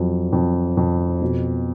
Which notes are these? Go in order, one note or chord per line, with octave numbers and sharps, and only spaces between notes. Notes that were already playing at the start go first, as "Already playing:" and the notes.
Already playing: F2 F#3
F2
F2
B2